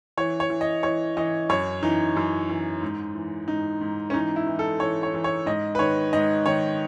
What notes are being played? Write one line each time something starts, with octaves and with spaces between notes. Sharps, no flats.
E3 C#5
C#5
E3
D#5
E3 C#5
E3 D#5
F#2 C#5
E3 D#4
F#2
E3
G#2
E3
G#2 D#4
G#2
C#4
E3 D#4
E4
E3
A4
E3 C#5
C#5
E3
C#5
G#2 D#5
B4
D#3 C#5
G#2 D#5
D#3 C#5